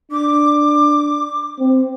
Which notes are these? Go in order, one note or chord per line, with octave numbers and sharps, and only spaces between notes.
D4 D6
C4